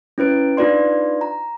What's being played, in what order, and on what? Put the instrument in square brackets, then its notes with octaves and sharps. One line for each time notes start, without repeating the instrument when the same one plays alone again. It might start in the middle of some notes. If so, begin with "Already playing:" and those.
[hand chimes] C#4 E4 B4 D7
D4 D#4 F4 B4 D5 C6
A#5